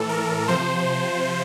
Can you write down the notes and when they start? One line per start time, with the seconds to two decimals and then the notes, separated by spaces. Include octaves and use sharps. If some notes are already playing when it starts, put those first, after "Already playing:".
Already playing: A2 E3 A4
0.09 A#4
0.48 C3 F3 C5